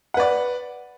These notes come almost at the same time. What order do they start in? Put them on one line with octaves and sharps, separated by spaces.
F#5 B4 D5